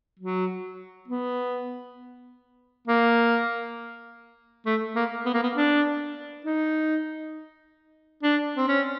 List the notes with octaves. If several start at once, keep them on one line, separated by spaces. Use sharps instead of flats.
F#3
B3
A#3
A3
A#3
B3
A#3
B3
D4
D#4
D4
C4
C#4